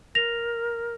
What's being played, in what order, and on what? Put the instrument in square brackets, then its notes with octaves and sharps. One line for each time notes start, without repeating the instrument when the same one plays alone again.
[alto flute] A#4 [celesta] A#6 F7